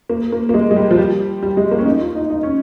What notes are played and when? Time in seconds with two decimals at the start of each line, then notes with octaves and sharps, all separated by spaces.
0.09 A#3
0.32 A#3
0.49 A#3
0.54 G#3
0.71 G#3
0.76 G3
0.91 F3
0.98 G3
1.42 G3
1.57 G#3
1.71 A#3
1.79 C#4
1.86 D#4
2.01 F4
2.15 D#4
2.30 D#4
2.43 C#4